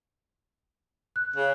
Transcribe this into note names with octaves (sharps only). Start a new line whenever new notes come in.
F#6
C#3